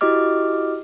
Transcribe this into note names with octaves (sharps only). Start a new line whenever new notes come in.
E4 F#4 G4 D#5 D6 F6